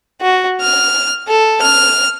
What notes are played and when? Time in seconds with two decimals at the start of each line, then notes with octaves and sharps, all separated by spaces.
0.21 F#4
0.61 F6
1.28 A4
1.62 F6